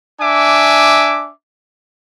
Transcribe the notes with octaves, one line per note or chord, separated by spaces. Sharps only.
D4 E5 G#5 D6